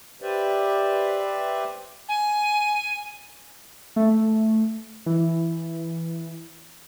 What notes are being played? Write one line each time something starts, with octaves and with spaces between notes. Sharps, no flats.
G4 B4 C5 D5 E5
G#5
A3
E3